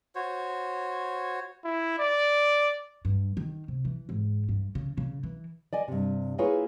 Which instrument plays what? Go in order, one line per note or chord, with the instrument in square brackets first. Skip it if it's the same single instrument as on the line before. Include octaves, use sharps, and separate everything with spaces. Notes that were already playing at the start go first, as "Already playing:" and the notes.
[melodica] F#4 C5 C#5
[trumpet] E4
D5
[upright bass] G2
D#3
C3
E3
G#2
G2
C#3
C#3
E3
[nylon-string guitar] D5 D#5 G#5
G2 C3
A#3 E4 F4 G#4 B4 C#5